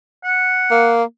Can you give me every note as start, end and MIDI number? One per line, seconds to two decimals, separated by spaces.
0.24 0.91 78
0.71 1.03 58